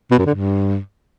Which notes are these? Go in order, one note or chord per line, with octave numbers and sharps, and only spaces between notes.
B2
F#2
D3
G2